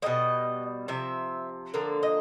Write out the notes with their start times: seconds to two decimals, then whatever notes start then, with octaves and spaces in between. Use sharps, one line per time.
0.02 A#3 D#5
0.05 B2 G3
0.88 C3 F3 E5
1.74 D3 F3 A#3
2.03 D#5